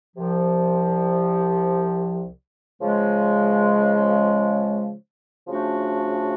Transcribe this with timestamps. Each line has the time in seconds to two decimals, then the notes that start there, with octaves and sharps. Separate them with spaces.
0.16 C2 C3 F3
2.81 C#3 F3 G#3
5.47 C#3 F3 A3 D4 F#4